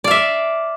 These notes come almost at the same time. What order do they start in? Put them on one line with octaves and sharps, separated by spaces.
D5 F5 E5